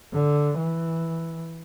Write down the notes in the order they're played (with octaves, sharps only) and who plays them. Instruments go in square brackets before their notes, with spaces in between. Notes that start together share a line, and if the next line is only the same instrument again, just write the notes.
[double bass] D3
E3